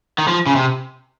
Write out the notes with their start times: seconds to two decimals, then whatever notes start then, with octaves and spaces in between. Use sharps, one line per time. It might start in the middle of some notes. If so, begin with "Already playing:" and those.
0.18 D#3
0.28 F3
0.46 C#3
0.56 C3